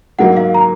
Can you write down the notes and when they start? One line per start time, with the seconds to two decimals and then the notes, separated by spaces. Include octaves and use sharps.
0.18 G#2 F#3 A#3 D#4 F#5
0.37 F5
0.54 A#5